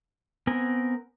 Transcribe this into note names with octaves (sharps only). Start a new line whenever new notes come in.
B3 C4 A#4 G#5